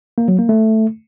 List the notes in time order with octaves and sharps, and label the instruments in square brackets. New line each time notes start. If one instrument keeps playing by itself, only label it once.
[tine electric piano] A#3
F#3
A#3
A3